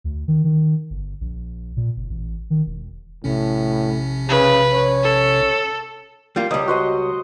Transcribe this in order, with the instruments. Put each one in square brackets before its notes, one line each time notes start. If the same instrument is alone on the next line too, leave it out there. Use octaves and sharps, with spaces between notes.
[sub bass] D2
D#3
D#3
G1
A#1
A#2
F#1
A1
D#3
E1
[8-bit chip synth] A#1 C3 C#4 [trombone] A2
[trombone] C#3 [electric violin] B4
[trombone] C#5
[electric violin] A4
[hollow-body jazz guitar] G3 A#3 F4
[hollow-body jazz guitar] C#2 G3 [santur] D#5
[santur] F#4 C5 D#5